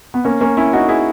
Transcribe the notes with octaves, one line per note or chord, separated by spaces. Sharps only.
B3
A#3 C#4
A#3 C#4
C#4 E4
D#4 F#4
E4 G#4